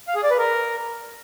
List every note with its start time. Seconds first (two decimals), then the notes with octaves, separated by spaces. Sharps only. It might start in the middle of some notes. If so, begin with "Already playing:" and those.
0.08 F5
0.15 G#4
0.23 D5
0.30 B4
0.38 A#4